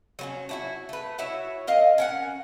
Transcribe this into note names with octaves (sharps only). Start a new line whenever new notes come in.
F#3 B3 C#4
D4 E4 F#4
A3 B4
E4 F#4 C#5 E5
A#4 D#5 F5
C#4 A#4 F#5